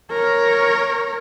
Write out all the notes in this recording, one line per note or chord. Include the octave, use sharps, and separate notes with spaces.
A#4 C#5